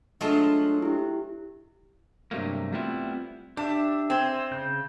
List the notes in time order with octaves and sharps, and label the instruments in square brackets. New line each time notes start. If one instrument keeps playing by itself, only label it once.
[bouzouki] F#3 F4 A5 [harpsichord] G#3 A3 [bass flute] D4
[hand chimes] E4 G4
[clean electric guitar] G2 C3 E3 F#3 A3 A#3
G3 A3 B3 C4 E4 F4
[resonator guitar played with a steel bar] D4 [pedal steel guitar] G4 E5
[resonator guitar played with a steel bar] C4 [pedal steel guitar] E5 G#5 C6
[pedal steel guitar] C#3 G6